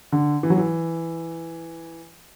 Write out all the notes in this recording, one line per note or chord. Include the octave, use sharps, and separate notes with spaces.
D3
E3
F#3
E3